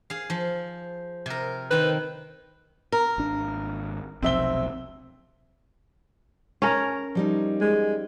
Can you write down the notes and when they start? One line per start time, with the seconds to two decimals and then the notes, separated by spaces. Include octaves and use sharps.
0.10 G#4 F5
0.30 F3
1.26 C3 A#4
1.71 D#3 C4 B4
2.92 A#4
3.18 G#1 D4
4.22 F1 B1 F2 C4 E5 G7
6.62 C#4 A#4 A5 A#5
7.15 F3 G3 D#4
7.61 G#3